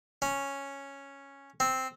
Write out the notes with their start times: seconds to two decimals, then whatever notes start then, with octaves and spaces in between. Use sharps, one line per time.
0.22 C#4
1.60 C4